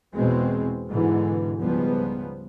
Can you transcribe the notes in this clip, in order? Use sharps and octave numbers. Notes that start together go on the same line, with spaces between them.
E2 B2 G#3 C4
G#2 B2 D3 E3
C#2 G#2 F3 G3 B3